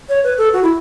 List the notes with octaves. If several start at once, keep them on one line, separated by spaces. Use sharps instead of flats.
C#5
B4
A4
F#4
E4